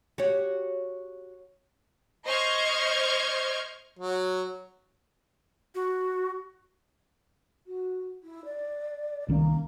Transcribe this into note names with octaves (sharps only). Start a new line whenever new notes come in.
F#4 G4 C#5
C5 D#5 C#6 F6 G6 G#6
F#3
F#4
F#4
E4
D5
C2 D#3 A#3 C#4